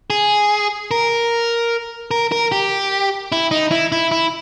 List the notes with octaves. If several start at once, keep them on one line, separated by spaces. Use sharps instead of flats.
G#4
A#4
A#4
A#4
G4
E4
D#4
E4
E4
E4